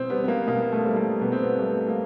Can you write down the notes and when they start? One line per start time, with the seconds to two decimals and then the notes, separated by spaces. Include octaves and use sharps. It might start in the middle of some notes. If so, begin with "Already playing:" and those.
Already playing: B2 C4
0.10 G3 B3
0.24 B3
0.28 A#3
0.48 B2 A#3
0.72 A3
0.85 G3
0.96 A#3
1.21 B2 B3
1.32 C4
1.43 B3
1.58 G3 A3
1.88 A#3